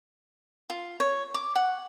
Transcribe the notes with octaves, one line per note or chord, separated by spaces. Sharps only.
F4
C#5
D6
F#5